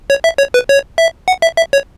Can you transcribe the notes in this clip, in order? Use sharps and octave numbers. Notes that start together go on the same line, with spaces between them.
C#5
E5
C#5
B4
C#5
E5
F#5
E5
E5
C#5